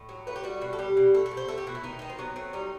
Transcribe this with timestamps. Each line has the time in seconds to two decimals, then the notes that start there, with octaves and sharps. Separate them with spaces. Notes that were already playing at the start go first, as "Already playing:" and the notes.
Already playing: A2
0.09 F#3
0.27 A3 B4
0.36 G4
0.44 G3 F#4
0.61 B2 F#4
0.73 A4
0.78 G3 G4
0.97 B2
1.14 A3 A4
1.26 A4
1.31 B2
1.37 C5
1.48 A3 A4
1.58 G4
1.67 B2 F#4
1.75 E4
1.83 D#3 D#4
1.99 D#3 D#4
2.09 C4
2.19 F#3 B3
2.36 A3 C4
2.53 G3 D#4